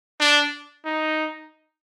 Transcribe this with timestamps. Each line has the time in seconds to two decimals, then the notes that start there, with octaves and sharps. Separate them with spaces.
0.20 D4
0.85 D#4